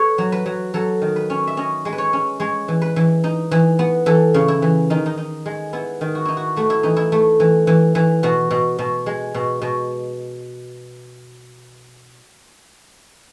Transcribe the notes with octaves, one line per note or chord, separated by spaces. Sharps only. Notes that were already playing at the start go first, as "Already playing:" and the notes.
Already playing: A4 B4 C#5
F#3
B4
F#3
F#3 A4
D#3
B4
C#4
E5
C#4 D#5
G#3
B4
C#5
C#4
G#3 C#5
E3
B4
E3
D#4
E3
B3
E3 A4
C#3
E4
E3
D#3 D#4
D#4
D#4
G#3
B3 E4
D#3
F#4
D#4 E4
F#4
A3 F#4
E4
E3 D#4
E4
A3
E3
E3
E3
B2 F#4
B2
B2
G#3
B2
B2